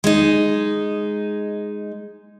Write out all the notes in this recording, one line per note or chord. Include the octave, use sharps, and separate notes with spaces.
G#3 D#4